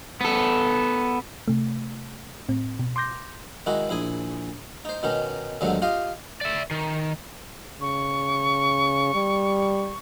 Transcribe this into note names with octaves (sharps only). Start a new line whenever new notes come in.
B3 A4
C3 A3
A2 C4
B2
C6 D6 G6 A#6
D#3 G#3 E4 F#4
A#1 E4 G#4 G#5
D#4 C5
B2 D#3 C#4 D#4
D#2 G#2 D3 D#3 F#3 A3
F4 G4 D#5 F5
D5 E5
D#3
C#3 C#6
G3